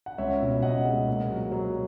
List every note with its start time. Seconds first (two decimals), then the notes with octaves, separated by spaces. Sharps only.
0.06 F#5
0.18 C#2 C#5 E5
0.41 B2
0.63 C#2 D#5 F#5
0.85 G#3
1.07 A#2
1.30 F#3
1.52 F#3